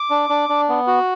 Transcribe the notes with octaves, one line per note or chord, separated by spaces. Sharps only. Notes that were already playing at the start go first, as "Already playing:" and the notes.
Already playing: D6
D4
D4
D4
B3
F#4